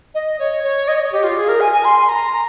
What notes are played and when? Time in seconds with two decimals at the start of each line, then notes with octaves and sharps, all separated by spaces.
0.14 D#5
0.38 C#5
0.63 C#5
0.87 D#5
0.99 C#5
1.12 G4
1.23 F4
1.36 G#4
1.48 A#4
1.60 G#5
1.71 G#5
1.84 C6
2.08 A#5
2.32 A#5